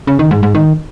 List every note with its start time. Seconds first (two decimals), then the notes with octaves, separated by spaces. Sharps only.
0.07 C#3
0.19 D#3
0.31 G#2
0.43 G#2
0.55 D#3